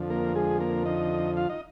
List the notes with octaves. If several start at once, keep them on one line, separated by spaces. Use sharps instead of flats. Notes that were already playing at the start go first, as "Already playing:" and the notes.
Already playing: F2 D3 F3
A#3 A#4
G#3 G#4
A#3 A#4
D#4 D#5
F4 F5
D#4 D#5